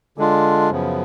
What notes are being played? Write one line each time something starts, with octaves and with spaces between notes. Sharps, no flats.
D3 G#3 D4 F4
F#2 C#3 F3 B3